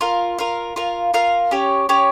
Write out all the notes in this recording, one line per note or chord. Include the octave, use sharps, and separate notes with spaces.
F4 A#4 F5
F4 A#4 F5
F4 A#4 F5
F4 A#4 F5
C#4 G4 C#5
C#4 G4 C#5